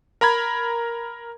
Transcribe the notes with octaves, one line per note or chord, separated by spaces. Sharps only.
A#4 A#5 B5 G#6